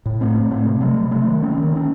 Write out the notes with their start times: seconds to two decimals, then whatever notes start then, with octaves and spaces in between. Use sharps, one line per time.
0.06 A2
0.21 A3 C4
0.35 A2
0.51 A3 C4
0.66 C3
0.81 F#3 A3
0.97 C3
1.11 F#3 A3
1.27 D#3
1.42 A#3 C#4
1.58 D#3
1.73 A#3 C#4